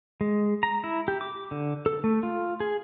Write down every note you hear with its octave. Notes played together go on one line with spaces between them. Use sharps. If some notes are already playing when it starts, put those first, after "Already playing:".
G#3
A#5
E4
G4
D6
D3
A4
A3
F4
G#4